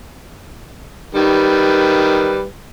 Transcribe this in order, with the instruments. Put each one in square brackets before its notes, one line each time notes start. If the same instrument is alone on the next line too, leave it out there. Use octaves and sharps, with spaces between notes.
[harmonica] D#3 G3 B4